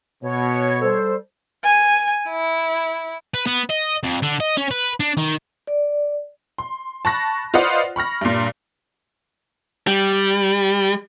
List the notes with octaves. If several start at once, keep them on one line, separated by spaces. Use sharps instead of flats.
B2 C#5
G3 A4 C5
G#5
E4
B4
B3
D#5
F2
D3
D#5
C#4
B4
D4
D#3
D5
C6
A5 B5 C#6 F#6 A#6
F4 B4 C5 D5 D#5 F#5
B5 C#6 F6 A#6
G2 A#2
G3